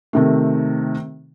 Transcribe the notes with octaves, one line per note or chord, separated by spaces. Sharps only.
C3 D#3 A3